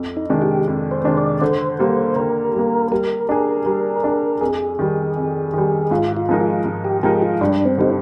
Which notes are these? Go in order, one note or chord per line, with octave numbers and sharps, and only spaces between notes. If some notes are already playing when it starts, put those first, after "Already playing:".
Already playing: F2
D#4
C3 D#3 G#3 D4
G4
F2
C5
C3 D#3 G#3 D4
D5
D3 C5
G3 A#3
D3 A#4
G3 A#3
G3 A#4
D4 G#4
G3
D4 G#4
F2 G#4
D#3 G3
F2
D#3 G3
G#2 F4
F4
F3 G#3 D#4 A#4
F4
G#2
G4
F3 G#3 D#4 G4 A#4
F4
G2 D4
C4
D3 G3 D#4